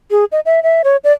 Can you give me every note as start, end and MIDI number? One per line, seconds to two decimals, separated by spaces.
0.11 0.25 68
0.32 0.40 75
0.46 0.63 76
0.63 0.82 76
0.84 0.97 73
1.04 1.13 74